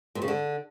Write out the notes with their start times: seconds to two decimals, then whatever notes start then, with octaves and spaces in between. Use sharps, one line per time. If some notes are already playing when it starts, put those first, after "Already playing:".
0.15 A#2
0.22 C#3
0.28 D3